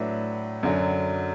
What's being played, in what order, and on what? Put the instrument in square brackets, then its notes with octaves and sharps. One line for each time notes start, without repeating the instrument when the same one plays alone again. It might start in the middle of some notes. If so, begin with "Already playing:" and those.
Already playing: [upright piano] A2 F#3 D4 B4 E5
F#2 D3 F#3